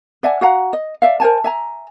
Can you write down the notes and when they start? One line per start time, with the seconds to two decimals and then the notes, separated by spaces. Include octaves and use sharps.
0.23 D5 E5 F#5 G#5
0.41 F#4 F5 F#5 A#5
0.73 D#5
1.02 D5 E5 F5
1.20 A#4 C5 G#5 A5
1.44 E5 G#5 A#5